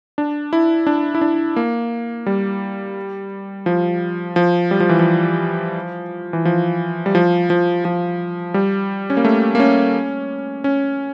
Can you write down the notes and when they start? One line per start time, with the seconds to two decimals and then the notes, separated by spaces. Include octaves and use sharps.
0.18 D4
0.53 E4
0.87 D4
1.15 E4
1.21 D4
1.56 A#3
2.26 G3
3.66 F3
4.36 F3
4.71 G3
4.80 F3
4.89 E3
4.99 F3
6.33 E3
6.45 F3
7.06 G3
7.15 F3
7.50 F3
7.85 F3
8.54 G3
9.10 C#4
9.17 A#3
9.25 A3
9.55 A#3
9.60 C#4
10.64 C#4